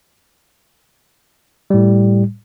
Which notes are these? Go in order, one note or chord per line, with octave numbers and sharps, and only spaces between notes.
A2 G3